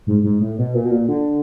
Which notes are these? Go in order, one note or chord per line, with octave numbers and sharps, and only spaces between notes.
G#2
G#2
A2
B2
A#2
B2
A#2
D3